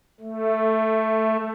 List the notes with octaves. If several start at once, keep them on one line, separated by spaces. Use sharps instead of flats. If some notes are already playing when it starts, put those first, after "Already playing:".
A3